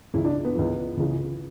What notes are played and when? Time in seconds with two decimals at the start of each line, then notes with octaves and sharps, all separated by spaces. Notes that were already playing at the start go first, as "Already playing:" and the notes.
0.14 C#2 C#3 E3 E4
0.25 D4
0.45 B3
0.55 C#2 C#3 E3
0.97 C#2 C#3 E3